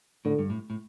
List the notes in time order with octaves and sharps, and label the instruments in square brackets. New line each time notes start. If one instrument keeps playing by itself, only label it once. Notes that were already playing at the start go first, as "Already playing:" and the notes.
[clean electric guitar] A2 [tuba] D3
[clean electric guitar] G2
A2
A2